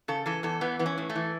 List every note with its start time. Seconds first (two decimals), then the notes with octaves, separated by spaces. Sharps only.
0.08 C#3 A4
0.26 E3 A4
0.43 E2 A4
0.61 E3 B3
0.79 E3 B3
0.86 C#4
0.98 A2
1.10 A3
1.15 E3